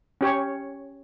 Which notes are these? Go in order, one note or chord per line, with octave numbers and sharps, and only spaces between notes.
C#4 G4 C#5